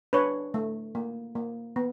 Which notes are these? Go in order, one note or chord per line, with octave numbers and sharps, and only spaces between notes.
D4 B4 C#5
A3
A#3
A#3
B3